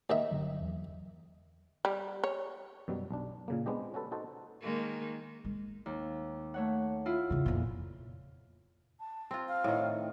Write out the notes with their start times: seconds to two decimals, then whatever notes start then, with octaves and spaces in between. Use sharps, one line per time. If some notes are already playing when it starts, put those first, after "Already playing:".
0.10 D#2 D#3 E5
0.31 G1 D3 F#3
0.61 E2 F#3
1.85 G3
2.23 C#5
2.88 F#2 B2 F#3 G3
3.11 B1 D4
3.48 A#2 C#3 A#3
3.66 G#3 B3 C4 D4 G4 D#5
3.94 C#4 F#4 A4 B4
4.12 D#4 F#4 A4 C5
4.61 D#3 G#3 A#3
5.45 G#3
5.86 D#2
6.54 A3 C#5 F#5
7.06 E4 F4
7.30 E2 C#3
7.46 F2 A#2
9.00 A5
9.31 C4 F4
9.48 F5
9.64 A2 D#3